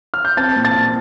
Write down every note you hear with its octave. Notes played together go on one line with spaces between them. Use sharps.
F6
G6
C4 A5 A6
A#2
A5 A6
A#2